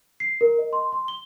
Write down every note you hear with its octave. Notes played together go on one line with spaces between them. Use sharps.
C7
A#4
D#5
C6
C6
G7